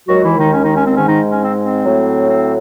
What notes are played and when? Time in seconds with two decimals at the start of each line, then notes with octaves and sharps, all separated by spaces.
0.09 D#2 D#3 F#3 G#3 F#4
0.23 E3 E4
0.38 D#3 D#4
0.54 C#4
0.64 D#3 D#4
0.76 C#4
0.86 C4
0.97 G#2 D#3 C#4
1.02 G#3
1.09 D#3 D#4
1.31 C#4
1.41 C4
1.62 C4
1.85 A2 F#3 A3
2.30 C4